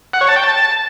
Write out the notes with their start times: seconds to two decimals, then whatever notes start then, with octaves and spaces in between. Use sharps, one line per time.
0.13 F#5
0.21 C#5
0.28 A5
0.36 G5
0.44 A5